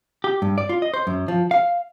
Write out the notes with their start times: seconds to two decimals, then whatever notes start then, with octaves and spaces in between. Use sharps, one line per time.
0.24 G4
0.42 G2
0.58 D5
0.69 F4
0.82 D#5
0.94 C5
1.07 F#2
1.28 F3
1.51 F5